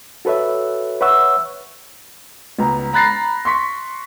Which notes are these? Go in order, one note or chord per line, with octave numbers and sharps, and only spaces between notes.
F#4 A4 B4 C#5 E5
B4 C#5 E5 F#5 C#6 E6
C#2 B3 A#5
A#5 B5 F#6 A6 A#6 C7
C6 C#6 B6